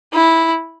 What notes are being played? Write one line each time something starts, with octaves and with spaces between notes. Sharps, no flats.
E4